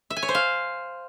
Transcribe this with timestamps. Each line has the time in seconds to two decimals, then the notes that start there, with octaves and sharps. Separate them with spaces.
0.10 E5
0.17 G#5
0.23 C#5
0.29 C5
0.35 F5